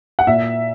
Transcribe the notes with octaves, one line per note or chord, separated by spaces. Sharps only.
F#5
A#2 E5